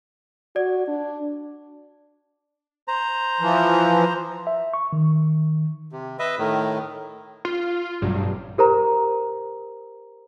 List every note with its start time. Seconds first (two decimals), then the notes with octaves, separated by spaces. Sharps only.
0.56 F#4 D5
0.87 D4
2.88 C5 A#5
3.40 E3 F3
4.47 E5
4.74 C#6
4.93 D#3
5.92 C3
6.19 B4 D#5 E5
6.39 A2 D#3
7.45 F4
8.02 A1 G2 B2 F#3
8.58 G4 A#4 C5 A#5